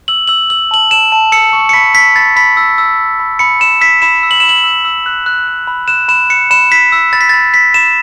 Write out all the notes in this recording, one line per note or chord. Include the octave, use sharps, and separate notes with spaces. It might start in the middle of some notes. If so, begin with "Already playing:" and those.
E6 F#7
E6 F#7
E6 F#7
A5 F#7
A5 E7
A5
E6 C#7
C#6
C#7
B5 B6
E6 B6
B5 A6
B5 B6
E6
E6
B5
B5
B5 C#7
B5 E7
E6 B6
B5 E7
E6
F#7
B5 E7
F#7
E6
E6
F#6
F#6
F#6
B5
F#6 E7
B5 E7
F#6 C#7
B5 E7
B5 B6
E6
B5 A6
B6
B5 A6
B5 B6
B5 E7